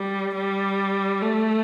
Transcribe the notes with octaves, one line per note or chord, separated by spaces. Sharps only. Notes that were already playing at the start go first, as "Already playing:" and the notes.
Already playing: G3
G3
A3